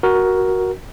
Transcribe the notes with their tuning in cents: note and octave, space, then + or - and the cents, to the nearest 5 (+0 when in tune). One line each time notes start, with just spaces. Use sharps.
F#4 +5 A#4 +10